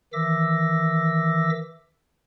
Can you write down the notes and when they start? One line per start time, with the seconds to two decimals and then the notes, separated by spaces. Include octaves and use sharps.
0.13 D#3 E3 E5 D6 E6 A#6